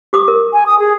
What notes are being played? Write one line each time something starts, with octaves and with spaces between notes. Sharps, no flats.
G4 D6 D#6
A#4
G#5
D#6
G#4